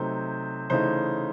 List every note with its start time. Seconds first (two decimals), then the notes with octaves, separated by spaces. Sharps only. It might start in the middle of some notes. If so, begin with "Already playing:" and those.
Already playing: C3 F#3 A3 D#4 C5
0.70 C#3 E3 A3 D#4 C5